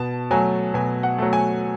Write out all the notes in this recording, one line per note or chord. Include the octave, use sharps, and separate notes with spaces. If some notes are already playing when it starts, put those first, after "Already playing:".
Already playing: B2 A5
F#3 A3 G#5
B2 G#5
F#5
F#3 A3
G#5